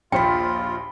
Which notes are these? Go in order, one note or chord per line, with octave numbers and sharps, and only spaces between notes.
A#1 D#2 F4 C5 G5 B5 C6